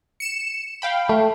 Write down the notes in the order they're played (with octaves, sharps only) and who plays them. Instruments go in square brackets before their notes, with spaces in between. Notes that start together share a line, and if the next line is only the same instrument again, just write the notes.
[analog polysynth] C#7 E7
F5 G5 B5
[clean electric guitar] A3